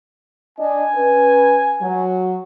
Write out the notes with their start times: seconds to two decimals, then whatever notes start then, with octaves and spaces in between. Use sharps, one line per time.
0.59 D4 D#5 G#5
0.95 C#4 B4
1.82 F#3